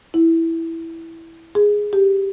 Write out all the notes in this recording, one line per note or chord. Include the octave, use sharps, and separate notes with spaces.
E4
G#4
G4